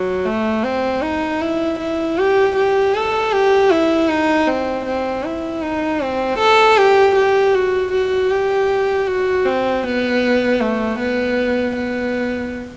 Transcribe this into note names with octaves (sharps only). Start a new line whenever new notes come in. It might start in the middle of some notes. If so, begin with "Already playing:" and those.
Already playing: F#3
A3
C4
D#4
E4
E4
G4
G4
A4
G4
E4
D#4
C4
C4
E4
D#4
C4
A4
G4
G4
F#4
F#4
G4
F#4
C4
B3
A3
B3
B3